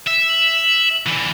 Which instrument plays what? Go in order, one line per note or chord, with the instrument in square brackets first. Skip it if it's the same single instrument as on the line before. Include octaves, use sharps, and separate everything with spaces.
[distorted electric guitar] E5
[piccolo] F#7
[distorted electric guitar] D3 E3